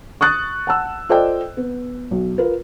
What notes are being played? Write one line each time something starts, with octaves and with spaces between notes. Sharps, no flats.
C#6 D#6 F#6 A6
F#5 A5 E6
F4 A4 C5 D5 D#5 G5
B3
B1
F4 A#4 B4